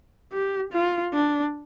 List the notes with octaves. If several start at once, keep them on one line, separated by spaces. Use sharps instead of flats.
G4
F4
D4